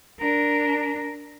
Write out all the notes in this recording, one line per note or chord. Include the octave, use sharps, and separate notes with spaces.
D4 A#4